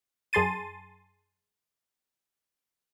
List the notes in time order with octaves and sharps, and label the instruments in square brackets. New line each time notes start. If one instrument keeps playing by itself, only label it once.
[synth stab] F#2 G#4 A5 C6 A6 D#7